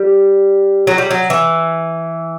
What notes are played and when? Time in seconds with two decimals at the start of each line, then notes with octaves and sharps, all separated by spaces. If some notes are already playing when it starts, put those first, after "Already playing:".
Already playing: G3
0.87 F#3
0.98 G3
1.11 F#3
1.30 E3